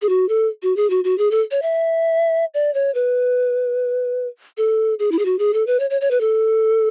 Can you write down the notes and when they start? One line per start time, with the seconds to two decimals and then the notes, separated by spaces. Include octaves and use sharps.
0.02 G#4
0.09 F#4
0.29 A4
0.63 F#4
0.77 G#4
0.90 F#4
1.04 F#4
1.18 G#4
1.31 A4
1.51 C#5
1.62 E5
2.54 D5
2.74 C#5
2.95 B4
4.58 A4
4.99 G#4
5.12 E4
5.19 G#4
5.25 F#4
5.39 G#4
5.54 A4
5.67 B4
5.80 C#5
5.90 C#5
6.01 C#5
6.11 B4
6.21 A4